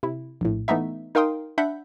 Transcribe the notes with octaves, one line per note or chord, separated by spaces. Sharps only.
C3 E4
A#1 A2
E3 A3 B3 D#4 E5
D#4 A#4 F5 G5 C6 D#6
D4 E5 F#5 B5 G6 B6